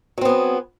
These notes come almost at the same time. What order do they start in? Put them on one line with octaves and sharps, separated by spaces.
F#3 C4 B3 G#4